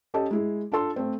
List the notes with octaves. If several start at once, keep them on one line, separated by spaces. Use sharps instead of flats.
C#4 G4 A4 D#5 A5
G#3 E4 G#4
D4 F4 A4 C6
A3 C4